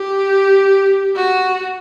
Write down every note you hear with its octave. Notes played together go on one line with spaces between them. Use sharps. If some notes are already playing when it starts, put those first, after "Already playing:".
Already playing: G4
F#4